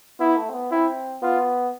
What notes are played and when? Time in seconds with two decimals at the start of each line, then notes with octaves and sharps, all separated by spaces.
0.19 B3 E4
0.36 A3
0.49 C4
0.53 B3
0.71 C4 E4
1.22 B3 F4